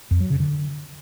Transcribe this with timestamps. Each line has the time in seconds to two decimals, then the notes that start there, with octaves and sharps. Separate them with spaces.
0.11 F2
0.21 F#3
0.30 C#3
0.40 D3